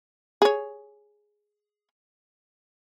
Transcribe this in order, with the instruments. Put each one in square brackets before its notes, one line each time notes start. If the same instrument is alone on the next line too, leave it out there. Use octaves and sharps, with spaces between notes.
[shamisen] G#4 C#5